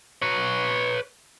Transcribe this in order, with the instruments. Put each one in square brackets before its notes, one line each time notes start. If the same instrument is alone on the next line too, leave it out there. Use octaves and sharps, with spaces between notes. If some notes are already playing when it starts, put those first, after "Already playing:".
[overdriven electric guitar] B4 C#5